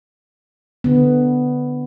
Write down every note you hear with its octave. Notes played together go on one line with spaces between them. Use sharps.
D3 B3